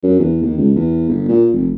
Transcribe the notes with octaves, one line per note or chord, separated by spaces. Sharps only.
F#2
E2
D#2
C#2
E2
G1
A#2
F1